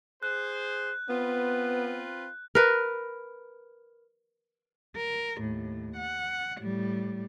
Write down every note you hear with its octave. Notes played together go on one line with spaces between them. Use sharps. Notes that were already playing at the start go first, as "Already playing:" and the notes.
G#4 C5 F#6
B3 C4 F4 B4
A#4 B4
A#4
D#2 A2
F#5
A2 G3